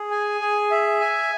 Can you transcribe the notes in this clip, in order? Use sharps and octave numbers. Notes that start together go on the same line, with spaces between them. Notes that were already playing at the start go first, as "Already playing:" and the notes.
Already playing: G#4
G#5
G#4
E5
G#5